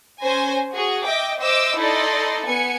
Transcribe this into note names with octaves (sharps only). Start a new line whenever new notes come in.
C#4 C5 G#5 A#6
F#4 G#4
D#5 E5 G5 D6
C5 D#5 E5 D6 E6
D#4 E4 A4 D5 D#5 C6
B3 G#5 C#7